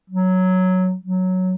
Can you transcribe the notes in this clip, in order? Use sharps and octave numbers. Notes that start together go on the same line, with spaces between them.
F#3
F#3